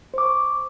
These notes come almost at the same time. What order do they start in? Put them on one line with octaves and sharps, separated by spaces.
C5 D6 C#6